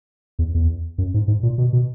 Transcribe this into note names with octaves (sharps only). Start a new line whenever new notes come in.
E2
E2
F#2
G#2
G#2
A#2
B2
B2